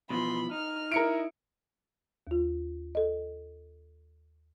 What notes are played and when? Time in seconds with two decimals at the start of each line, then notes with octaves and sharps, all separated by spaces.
0.10 B2 E3 F3 B5 C6
0.51 D#4 F6
0.92 E4 A#4 C#7 D7
2.27 D#2 F4
2.95 A4 D#5